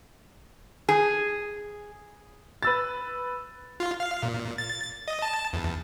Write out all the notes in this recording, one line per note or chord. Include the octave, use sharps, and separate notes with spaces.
G#4
B4 E6 A6
F4
F5
A#2
A6
D#5
A5
E2